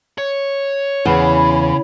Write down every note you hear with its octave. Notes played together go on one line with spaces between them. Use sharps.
C#5
E2 C#3 C#5 B5